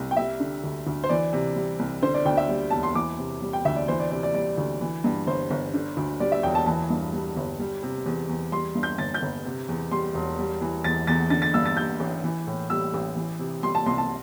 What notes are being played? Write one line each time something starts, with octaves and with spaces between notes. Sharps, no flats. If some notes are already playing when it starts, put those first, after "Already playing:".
Already playing: C2
G5
G3 E5
D3
D2
D2
C5
E3 D5
C3
G3
C2
D3 C5
D5
D2 G5
E5
G3
E1 A5
C6
E3 D6
C3
G3
G5
D2 E5
D5
E3 C5
D5
C3 D5
D5
G3 D5
D2
E3
G2
G1 C5
G1
D3
D2
G3 D5
E5
E1 G5
A5
E3 A5
G2
G3
G1
G3
C3
E2
E2
G3 C6
G2
G6
G1 A6
G6
G1
C3
E2
G3 C6
E1
G3
E3
E2 A6
E2 A6
D3 A6
A6
G2 E6
A6
G3 G6
A1
E3
A2
G3 E6
A1
E3
C3
G3 C6
A5
C2 C6
A5